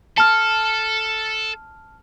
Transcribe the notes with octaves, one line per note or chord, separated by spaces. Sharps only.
A4 A5 F6